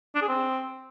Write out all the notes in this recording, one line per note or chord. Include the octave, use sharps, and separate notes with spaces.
D4
G#4
C4